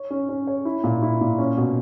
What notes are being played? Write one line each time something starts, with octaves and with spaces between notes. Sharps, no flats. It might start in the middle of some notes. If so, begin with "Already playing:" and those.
Already playing: C#5
C#4
C#4
C#5
E4
A#2
E4
A#2
C#4
B2